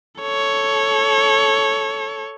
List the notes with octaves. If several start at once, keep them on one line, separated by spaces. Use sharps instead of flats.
A4 C#5